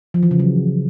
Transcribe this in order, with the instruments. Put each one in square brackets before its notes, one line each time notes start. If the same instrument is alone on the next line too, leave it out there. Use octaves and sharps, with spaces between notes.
[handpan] F3
E3
C#3
F#3